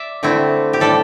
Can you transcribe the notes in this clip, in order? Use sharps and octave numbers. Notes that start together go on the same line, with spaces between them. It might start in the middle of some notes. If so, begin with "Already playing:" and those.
Already playing: D5 E5
D3 A3 C4 E4
G4
A2 G3 D4 A4